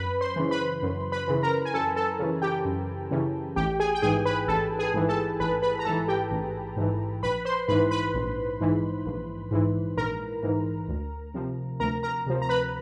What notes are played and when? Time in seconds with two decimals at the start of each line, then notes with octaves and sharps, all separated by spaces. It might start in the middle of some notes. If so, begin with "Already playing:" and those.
Already playing: F#2 B4 B5
0.21 C5 C6
0.36 C#3 E3
0.51 B4 B5
0.83 F#2
1.12 B4 B5
1.28 C#3 E3
1.43 A#4 A#5
1.65 G#5
1.74 F#2 A4 A5
1.96 A4 A5
2.19 C#3 E3
2.42 G4 G5
2.65 F#2
3.11 C#3 E3
3.56 A1 G4 G5
3.80 G#4 G#5
3.95 G5
4.02 G#2 E3 G#4 G#5
4.25 B4 B5
4.48 A1 A4 A5
4.79 G#4 G#5
4.94 G#2 E3
5.09 A4 A5
5.40 A1 B4 B5
5.62 B4 B5
5.79 A#5
5.85 G#2 E3 A4 A5
6.08 G4 G5
6.31 A1
6.77 G#2 E3
7.23 A#1 B4 B5
7.45 C5 C6
7.68 G#2 E3 B4 B5
7.91 B4 B5
8.15 A#1
8.61 G#2 E3
9.06 A#1
9.51 G#2 E3
9.97 A#1 A#4 A#5
10.43 G#2 E3
10.88 D2
11.34 C3 F3
11.80 D2 A#4 A#5
12.03 A#4 A#5
12.27 C3 F3
12.42 A#5
12.49 B4 B5